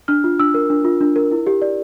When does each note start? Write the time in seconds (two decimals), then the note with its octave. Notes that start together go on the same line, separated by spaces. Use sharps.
0.08 D4 F6
0.24 F4
0.39 D4 E6
0.54 A#4
0.70 D4
0.84 F4
1.01 D4
1.16 A#4
1.31 E4
1.46 G4
1.62 D5